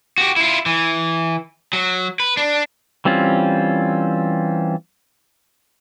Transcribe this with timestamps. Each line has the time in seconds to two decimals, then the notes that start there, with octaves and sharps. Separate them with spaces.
0.18 F#4 G4
0.36 E4 F4
0.66 E3
1.73 F#3
2.20 B4
2.37 D4
3.05 E3 G3 C4 C#4 F4